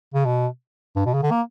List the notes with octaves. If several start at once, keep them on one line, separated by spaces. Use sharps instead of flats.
C#3
B2
G2
B2
C#3
D3
A#3